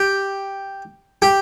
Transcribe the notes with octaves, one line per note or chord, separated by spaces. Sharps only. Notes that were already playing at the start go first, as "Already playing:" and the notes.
Already playing: G4
G4